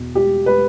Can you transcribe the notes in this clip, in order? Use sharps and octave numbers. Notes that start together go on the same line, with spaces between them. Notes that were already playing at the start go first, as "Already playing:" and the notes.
Already playing: E2 B2
G4
B4